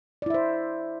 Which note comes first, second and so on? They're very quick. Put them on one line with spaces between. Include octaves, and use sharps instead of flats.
D5 E4 E5 C5